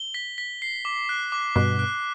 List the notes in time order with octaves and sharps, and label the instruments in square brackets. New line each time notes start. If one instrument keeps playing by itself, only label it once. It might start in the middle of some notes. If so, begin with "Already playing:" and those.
Already playing: [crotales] G7
B6
B6
C7
D6
F#6
D6
[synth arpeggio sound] G2 B2 [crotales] F#6
[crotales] F#6